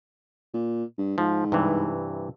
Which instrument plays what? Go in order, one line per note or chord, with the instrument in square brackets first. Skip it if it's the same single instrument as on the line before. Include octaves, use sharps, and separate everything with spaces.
[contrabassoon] A#2
G2
[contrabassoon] G#2 [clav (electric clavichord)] F3
[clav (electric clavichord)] G2 C3 E3